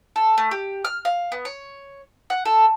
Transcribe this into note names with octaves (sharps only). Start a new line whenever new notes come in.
A4
A3
G4
F6
F5
B3
C#5
F#5
A4